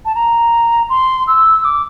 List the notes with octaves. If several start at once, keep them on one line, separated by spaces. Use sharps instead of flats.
A5
A#5
C6
E6
D6